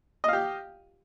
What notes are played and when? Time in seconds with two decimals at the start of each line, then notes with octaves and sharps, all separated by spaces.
0.24 D#5
0.28 F5
0.33 G4